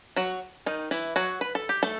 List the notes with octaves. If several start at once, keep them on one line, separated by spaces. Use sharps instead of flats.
F#3 F#4
D#3 D#4
E3 E4
F#3 F#4
B4
A4
G4
A3 A4